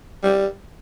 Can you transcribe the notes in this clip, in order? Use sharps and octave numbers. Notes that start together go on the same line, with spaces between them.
G3